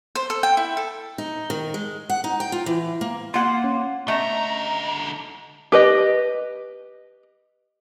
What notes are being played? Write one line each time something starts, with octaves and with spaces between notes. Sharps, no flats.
C5
A4
G5
E4
A4
D#4
D#3
G#3
F#5
D#4
G5
F4
E3
A#3
A#3 F4 F#5 C6
C#4
D3 A3 D#5 A#5
G4 B4 D#5